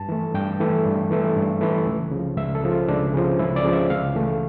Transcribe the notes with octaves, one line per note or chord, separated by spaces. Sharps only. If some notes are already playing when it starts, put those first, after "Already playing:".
Already playing: G2 A5
E3 A3
G2 G5
E3 A3
G2
E3 A3
G2
E3 A3
C#2
C#3 F3
C#2 E5
A4
C#3 F3
F4
C#2 D4
C#3 F3
C#2 E4
D5
C#3 F3
E5
C#2 F5
C#3 E3 A3